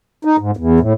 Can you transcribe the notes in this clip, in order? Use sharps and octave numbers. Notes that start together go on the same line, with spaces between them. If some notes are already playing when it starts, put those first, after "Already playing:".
D#4
G#2
E2
A2